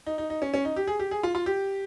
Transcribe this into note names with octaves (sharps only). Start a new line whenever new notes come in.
D#4
D#4
D#4
C#4
C#4
D#4
G4
G#4
G4
G#4
F4
F4
G4